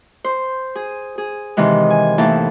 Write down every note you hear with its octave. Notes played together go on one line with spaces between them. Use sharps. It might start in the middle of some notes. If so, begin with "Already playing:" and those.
C5
G#4
G#4
C3 D#3 E3 G#3
G#5
D#2 A2 E3 A5